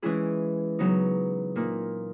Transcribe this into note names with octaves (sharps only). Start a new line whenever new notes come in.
E3 G#3 C#4 E4 G#4
C#3 F#3 B3 D#4
A#2 A#3 D#4